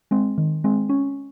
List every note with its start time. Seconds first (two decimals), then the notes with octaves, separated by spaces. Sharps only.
0.11 G#3 C4
0.38 D#3
0.64 G#3 C4
0.89 C#4